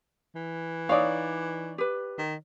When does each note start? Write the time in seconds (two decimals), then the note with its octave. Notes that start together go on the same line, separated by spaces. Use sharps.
0.35 E3
0.89 D#4 F4 C#5 D5 F5
1.78 G4 B4
2.19 D#3